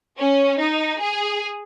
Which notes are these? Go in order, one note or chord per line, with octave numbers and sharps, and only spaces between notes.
C#4
D#4
G#4